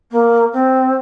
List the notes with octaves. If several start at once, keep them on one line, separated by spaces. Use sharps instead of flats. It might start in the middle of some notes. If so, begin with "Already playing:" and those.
A#3
C4